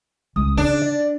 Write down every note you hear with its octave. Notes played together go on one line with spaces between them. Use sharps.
C#2 D#6
C#3 D4 D#4
D5